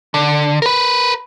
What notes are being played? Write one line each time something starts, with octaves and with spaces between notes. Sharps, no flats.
D3
A#4 B4